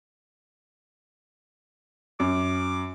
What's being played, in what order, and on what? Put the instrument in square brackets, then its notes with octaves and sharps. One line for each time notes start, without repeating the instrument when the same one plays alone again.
[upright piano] F#2 [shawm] D6